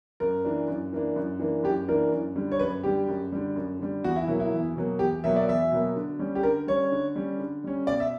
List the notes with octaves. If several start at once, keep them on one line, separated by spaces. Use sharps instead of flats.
F#2 A#4
E3 A#3 D4
F#2
E3 A#3 D4
F#2
E3 A#3 D4
F#2 G4
E3 A#3 D4 A#4
F#2
D3 G3
C#5
F#2 B4
D3 G3 G4
F#2
D3 G3
F#2
D3 G3
E2 F#4
E4
B2 F#3 A#3
E4
E2
B2 F#3 A#3
E2 G4
B2 F#3 A#3 E5
D5
E2 E5
B2 F#3 A#3
D3
G3 C#4
G4
D3 A#4
G3 C#4 C#5
D3
G3 C#4
D3
G3 C#4
B2 D5
E5